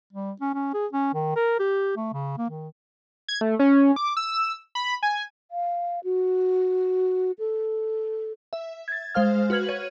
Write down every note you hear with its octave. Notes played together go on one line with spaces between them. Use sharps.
G3
C#4
C#4
G#4
C#4
D#3
A#4
G4
A3
C#3
A#3
D#3
G#6
A3
C#4
D6
E6
B5
G#5
F5
F#4
A4
E5
G#6 A6
G#3 C5 F5 F6
F#4 B4 F6 G#6 F#7
C#5 G#6 D#7